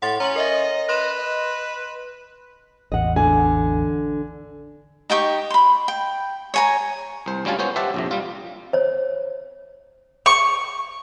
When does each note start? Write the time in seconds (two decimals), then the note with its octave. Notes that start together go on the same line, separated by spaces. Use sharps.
0.02 A2 F#5 C6 A6
0.20 C#4 A#5 C6 F#7
0.36 A#4 D#5 E5
0.89 B4 C6 E7
1.16 D#5
2.92 A1 E2 D#5 F#5
3.16 D3 G#5
5.10 D#4 G4 G5 C#6
5.51 B5 C6
5.88 G5
6.54 C#5 G#5 A#5
7.26 C2 C5
7.45 D2 G3 C#4 F4 G#5 A5
7.59 B3 C#4 C5 C#5
7.76 G4 C5 E5 F#5 A5
7.94 A#1 F2 C3
8.11 G3 F4
8.73 C5 C#5
10.26 C#6